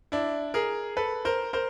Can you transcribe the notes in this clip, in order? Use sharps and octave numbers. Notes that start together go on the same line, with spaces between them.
D4 E4
G#4 A#4
A4 B4
A#4 C5
A#4 C5